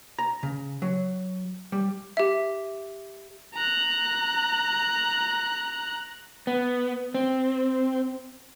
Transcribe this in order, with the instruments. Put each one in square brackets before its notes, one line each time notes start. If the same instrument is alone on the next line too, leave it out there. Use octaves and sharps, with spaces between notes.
[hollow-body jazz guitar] A#5
C#3
F#3
G3
[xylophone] G4 E5
[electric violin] A#5 F#6
[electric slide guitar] B3
C4